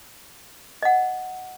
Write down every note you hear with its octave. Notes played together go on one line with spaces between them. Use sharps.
D#5 F#5